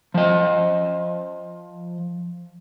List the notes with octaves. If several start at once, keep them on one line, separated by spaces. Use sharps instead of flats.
F3 D#5